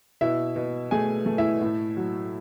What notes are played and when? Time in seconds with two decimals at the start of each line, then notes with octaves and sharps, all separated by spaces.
0.21 B2 E4 E5
0.56 B2
0.91 A3 G#4 G#5
1.26 A3
1.38 E4 E5
1.61 A2
1.97 F#3